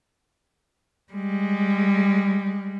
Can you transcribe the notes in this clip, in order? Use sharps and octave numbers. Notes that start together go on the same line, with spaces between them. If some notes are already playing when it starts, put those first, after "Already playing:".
G3 G#3